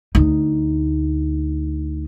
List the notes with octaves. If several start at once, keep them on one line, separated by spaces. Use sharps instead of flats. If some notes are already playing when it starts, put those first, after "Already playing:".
D2 D#4